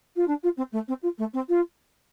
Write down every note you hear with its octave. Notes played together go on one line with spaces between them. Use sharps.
F4
D4
F4
C4
A3
C4
F4
A3
C4
F4